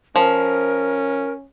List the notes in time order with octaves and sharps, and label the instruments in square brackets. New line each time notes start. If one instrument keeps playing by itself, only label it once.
[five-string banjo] F3 [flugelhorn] C#4 [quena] A#4